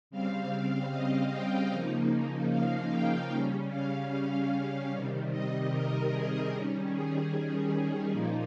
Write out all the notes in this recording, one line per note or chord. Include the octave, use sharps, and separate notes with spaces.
C#3 G3 C4 F5
D#5
G5
C#3 F3 A#3 D#4
F5
G5
C#3 G3 C#4
F5
C3 D#3 G3
D#5
A#4
G#4
D#3 G3 C#4
G#4
G#4
A#2 F3 A#3 D#4